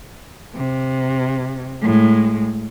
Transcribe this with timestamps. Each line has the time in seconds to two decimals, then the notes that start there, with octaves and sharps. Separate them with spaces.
0.55 C3
1.82 A2 G#3